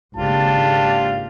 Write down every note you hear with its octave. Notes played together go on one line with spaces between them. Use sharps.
G#1 C#3 A#3 D4 F4 G4 A5